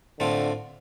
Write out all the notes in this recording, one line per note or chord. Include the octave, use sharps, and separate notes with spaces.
A2 D3 A3 C4 F4